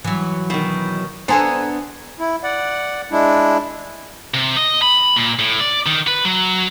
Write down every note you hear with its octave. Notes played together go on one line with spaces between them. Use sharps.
E3 F#3
B2 D#3
B3 D4 A4 C5 G#5 A#5
E4
D5 F#5
G#3 D4 E4
C3
D#5
B5
A#2
A2
D5
D#3
B4
F#3